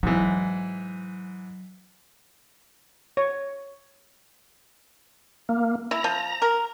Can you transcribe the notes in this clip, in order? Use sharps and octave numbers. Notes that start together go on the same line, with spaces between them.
G#2 E3 F#3
C#5
A#3
E4 A#5
F3
A#4